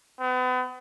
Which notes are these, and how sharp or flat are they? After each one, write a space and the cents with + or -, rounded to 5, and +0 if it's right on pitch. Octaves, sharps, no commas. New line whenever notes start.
B3 +40